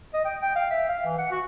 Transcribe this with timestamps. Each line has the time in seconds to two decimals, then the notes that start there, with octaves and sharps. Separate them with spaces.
0.13 D#5
0.25 G5
0.42 G5
0.55 F5
0.70 E5
0.89 F5
1.05 E3
1.18 F#5
1.31 F#4